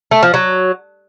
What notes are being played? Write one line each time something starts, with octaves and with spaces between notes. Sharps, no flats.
A3
F3
F#3